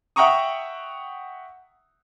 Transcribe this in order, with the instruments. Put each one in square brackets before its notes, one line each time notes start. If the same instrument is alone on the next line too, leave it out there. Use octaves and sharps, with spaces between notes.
[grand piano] E5 F#5 G5 A#5 C#6 D#6